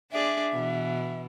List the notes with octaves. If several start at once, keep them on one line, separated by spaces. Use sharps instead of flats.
D4 G#4 D5 E5
B2 E3